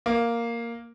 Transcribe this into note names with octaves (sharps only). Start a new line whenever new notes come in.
A#3